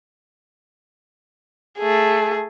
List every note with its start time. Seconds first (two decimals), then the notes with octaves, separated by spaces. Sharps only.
1.79 A3 G#4